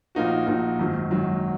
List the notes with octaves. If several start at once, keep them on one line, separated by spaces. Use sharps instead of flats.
A#1 A#2 A#3 D#4 F#4
A#1 A#2 A#3 D#4 F#4
G#1 F#2 D#3 F#3
G#1 F#2 D#3 F#3